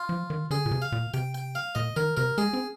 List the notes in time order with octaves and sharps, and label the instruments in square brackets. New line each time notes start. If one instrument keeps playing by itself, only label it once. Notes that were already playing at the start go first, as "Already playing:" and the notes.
Already playing: [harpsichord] F4
[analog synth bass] F3
D#3
[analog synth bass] D3 [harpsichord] G#4
[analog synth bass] A#2
C3
[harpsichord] F5
[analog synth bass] A#2
[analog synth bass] C3 [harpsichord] G5
[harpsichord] G5
F5
[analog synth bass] A#2 [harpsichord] D#5
[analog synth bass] D#3 [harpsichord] A#4
[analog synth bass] C3 [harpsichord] A#4
[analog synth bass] G#3 [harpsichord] G#4
[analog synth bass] C4